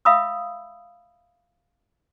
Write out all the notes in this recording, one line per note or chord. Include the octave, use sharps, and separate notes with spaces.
E5 F5 B5 D#6 E6